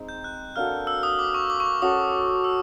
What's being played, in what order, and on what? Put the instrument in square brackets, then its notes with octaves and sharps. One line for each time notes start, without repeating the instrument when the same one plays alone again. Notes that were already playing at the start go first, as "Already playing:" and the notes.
Already playing: [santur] G#3 C4 D#4
[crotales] G6
F#6
[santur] A#3 D4 F#4 A4 [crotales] F6
[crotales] E6
D#6
D6
C#6
D6
C#6
D6
[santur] C#4 F#4 A4 [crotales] D#6
[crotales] E6